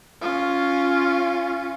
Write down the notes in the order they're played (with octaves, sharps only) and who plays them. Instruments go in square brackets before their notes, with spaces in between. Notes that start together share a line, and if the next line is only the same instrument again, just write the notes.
[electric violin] C#4 F4